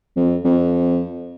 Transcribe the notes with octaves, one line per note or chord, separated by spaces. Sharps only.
F2
F2